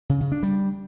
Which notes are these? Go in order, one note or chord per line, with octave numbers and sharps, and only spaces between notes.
C#3
C#3
D4
G3